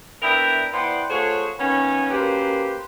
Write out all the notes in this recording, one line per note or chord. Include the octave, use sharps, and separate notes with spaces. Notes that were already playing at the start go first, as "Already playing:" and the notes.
B3 D4 E4 A#4 E5 G5
B3 E4 C5 D5 F#5 G5
A3 F4 G#4 C5 C#5 F#5
D#3 A#3 B3 C#4
F#2 A#3 G4 B4 C5